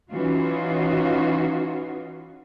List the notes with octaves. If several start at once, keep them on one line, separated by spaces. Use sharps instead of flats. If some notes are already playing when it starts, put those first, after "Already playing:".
E3 C#4 D#4 F4 F#4